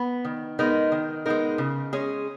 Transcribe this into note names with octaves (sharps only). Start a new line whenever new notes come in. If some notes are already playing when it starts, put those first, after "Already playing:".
Already playing: B3
D#3
G#3 B3 D#4 A#4
D#3
G#3 B3 D#4 A#4
C#3
G#3 C#4 G#4